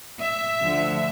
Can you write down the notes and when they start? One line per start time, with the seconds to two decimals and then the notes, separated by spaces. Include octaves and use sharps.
0.21 E5
0.61 D2 D3 F3